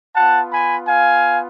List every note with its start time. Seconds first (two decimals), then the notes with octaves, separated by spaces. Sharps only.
0.15 B3 F4 F#5 A5
0.51 G#5 B5
0.87 F5 G#5